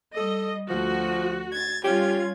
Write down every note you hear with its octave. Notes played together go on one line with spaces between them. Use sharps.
G3 A4 D#5
D2 F3 F#4
G#6 A6
G3 C#4 F4 G4 G#6